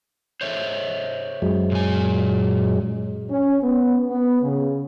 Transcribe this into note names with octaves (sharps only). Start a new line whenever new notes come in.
C5 C#5 E5
F#2 F#3 G#3
A#2 G#5
C#4
B3
B3
C#3